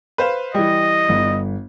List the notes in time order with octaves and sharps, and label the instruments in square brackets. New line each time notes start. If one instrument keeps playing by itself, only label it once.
[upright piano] B4 C5 F5
[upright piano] E3 G3 [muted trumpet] D#5
[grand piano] G1